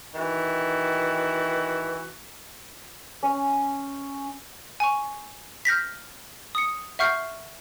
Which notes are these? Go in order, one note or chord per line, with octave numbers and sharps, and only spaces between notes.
D#3 E3 F#4
C#4
G#5 C#6
F6 G6 A#6 B6
D#6 C#7
E5 F#5 C#6 F6 G6 C7